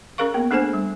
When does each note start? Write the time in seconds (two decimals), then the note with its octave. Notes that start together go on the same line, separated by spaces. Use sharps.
0.18 C#4 G#4 A#4 F5 C#6
0.34 A#3 B3 A#4
0.51 A3 D4 G#4 A4 C5 G#5
0.73 G3